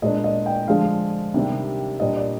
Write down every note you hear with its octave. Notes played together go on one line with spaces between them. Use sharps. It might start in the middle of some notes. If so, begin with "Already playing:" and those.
A#2 G#3 D4 D#5
D#5
G5
D3 F3 G#3 D4 F5
C3 D#3 G3 D4
A#2 G3 D4 D#5
D5